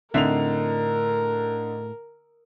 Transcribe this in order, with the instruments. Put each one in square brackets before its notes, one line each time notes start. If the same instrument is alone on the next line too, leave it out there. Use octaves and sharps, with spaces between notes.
[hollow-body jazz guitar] A2 C4 E5 [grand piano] D3 D#4 F7 [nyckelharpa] A#4